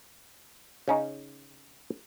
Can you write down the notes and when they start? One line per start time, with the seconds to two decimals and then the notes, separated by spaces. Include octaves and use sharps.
0.88 C#3 C#4 D#4